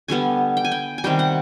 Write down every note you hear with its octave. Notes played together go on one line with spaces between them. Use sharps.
D3 G3 B3 G#5
G5
G#5
G5
G#5
C3 D#3 G3 G5
F#5